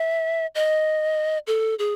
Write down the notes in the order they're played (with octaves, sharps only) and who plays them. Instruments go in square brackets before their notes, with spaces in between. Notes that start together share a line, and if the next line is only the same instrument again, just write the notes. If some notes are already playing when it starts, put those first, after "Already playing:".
Already playing: [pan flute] E5
D#5
A4
G#4